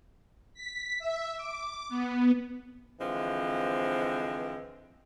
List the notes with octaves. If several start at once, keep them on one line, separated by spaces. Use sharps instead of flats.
B6
E5
D6
B3
D3 E3 F3 G#3 C4